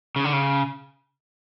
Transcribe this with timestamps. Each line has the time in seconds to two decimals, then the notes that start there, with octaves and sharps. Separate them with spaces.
0.16 C#3
0.24 D3
0.33 C#3